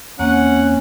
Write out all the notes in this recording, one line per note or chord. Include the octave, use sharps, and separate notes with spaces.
E2 A#3 C4 C#4 F#5